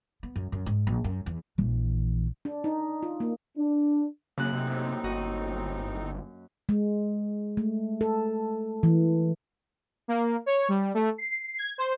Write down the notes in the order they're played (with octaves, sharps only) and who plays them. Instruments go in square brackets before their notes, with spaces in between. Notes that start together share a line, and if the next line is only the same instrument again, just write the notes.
[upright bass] B3
F#2
F#2
G#2
A#1
F#2
E2
A#1 E3
[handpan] D4
D#4
F4
A#3
[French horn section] D4
[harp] F#2 A#3 F#6 [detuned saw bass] C#3
[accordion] A2 C4 D#4 [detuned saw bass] C3
[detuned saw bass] G1 [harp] F#4 D#5
[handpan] G#3
A3
A4
E3
[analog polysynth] A#3
C#5
G3
A3
C7
G#6
C5